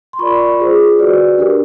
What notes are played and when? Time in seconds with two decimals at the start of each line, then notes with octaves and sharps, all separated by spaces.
0.13 C6
0.19 F4 A#4 D5 B5 C#6
0.60 F4 G#4 C5
0.99 F#4 B4 D5
1.39 D4 G4 A#4